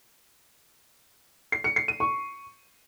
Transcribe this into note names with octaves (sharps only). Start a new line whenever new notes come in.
C7
C#7
C7
D#7
C#6